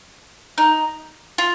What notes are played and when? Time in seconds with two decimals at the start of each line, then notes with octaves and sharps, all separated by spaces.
0.58 D#4
1.38 F4